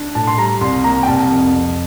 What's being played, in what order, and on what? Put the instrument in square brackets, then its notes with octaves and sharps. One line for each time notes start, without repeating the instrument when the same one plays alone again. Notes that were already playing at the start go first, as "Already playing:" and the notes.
Already playing: [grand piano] D4
A2 A5
C6
G3 A#5
C2 C6
A#3 A#5
G5
C2 A5
F2
F2